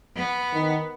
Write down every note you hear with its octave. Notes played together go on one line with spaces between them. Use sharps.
B3
D#3